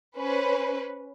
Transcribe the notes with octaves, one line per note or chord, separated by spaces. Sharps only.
C#4 B4 C5